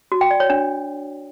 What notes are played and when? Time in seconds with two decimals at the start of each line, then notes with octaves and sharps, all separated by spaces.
0.12 F#4
0.21 G5
0.31 D5
0.40 C#5
0.50 D4